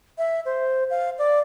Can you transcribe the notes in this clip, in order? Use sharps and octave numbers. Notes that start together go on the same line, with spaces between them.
E5
C5
F5
D5